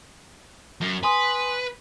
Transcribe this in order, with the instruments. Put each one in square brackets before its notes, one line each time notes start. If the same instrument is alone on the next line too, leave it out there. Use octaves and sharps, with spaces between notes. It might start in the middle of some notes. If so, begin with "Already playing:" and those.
[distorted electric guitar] F#2
[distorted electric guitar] B4 [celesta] G#5 C6 D#6